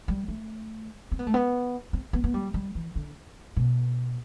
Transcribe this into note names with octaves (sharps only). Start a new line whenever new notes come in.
G3
A3
C4
B3
A3
B3
C4
B3
B3
G3
G3
E3
D3
B2